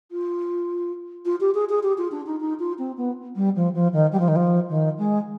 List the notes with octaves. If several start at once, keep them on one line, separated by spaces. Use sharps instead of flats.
F4
F4
G4
G#4
G#4
G4
F4
D4
D#4
D#4
F4
C4
B3
G3
F3
F3
D#3
G3
F3
D#3
F3
D#3
G#3